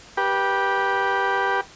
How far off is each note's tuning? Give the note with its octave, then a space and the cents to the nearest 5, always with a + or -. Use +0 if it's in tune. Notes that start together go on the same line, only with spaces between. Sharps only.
G4 +0 B4 -25